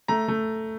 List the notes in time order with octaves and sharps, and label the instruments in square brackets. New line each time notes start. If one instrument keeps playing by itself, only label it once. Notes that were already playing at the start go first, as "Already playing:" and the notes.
[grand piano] A3 A#5
A3